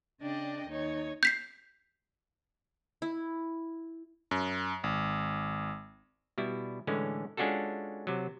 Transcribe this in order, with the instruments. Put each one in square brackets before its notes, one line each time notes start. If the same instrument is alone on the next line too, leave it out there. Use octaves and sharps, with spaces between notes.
[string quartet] C#3 D4 D5 D#5 G5
D#2 D#4 C#5
[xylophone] G6 B6 C7
[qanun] E4
[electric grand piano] F#2
G#1
[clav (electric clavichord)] B2 G3 E4
A2 D3 E3 G#3 C#4
G#3 C#4 D4 F4 F#4 A4
C3 F#3